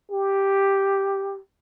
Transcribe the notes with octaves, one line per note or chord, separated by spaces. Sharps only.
G4